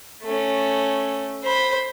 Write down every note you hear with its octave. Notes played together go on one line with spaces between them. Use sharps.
A3 C#4
C5 B5